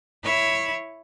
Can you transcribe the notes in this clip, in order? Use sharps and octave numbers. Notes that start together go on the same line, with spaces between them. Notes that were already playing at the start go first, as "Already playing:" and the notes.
E4 C#5